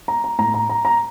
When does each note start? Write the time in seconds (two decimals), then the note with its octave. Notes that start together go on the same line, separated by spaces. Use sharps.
0.08 A#5
0.24 A#5
0.39 A2 A#5
0.54 A#5
0.70 A#5
0.85 A#5